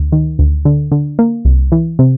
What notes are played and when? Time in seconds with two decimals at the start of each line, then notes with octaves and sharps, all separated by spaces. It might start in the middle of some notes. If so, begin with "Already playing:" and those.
Already playing: D2
0.12 D#3
0.39 D2
0.65 D3
0.92 D3
1.19 A#3
1.45 C2
1.72 E3
1.99 C3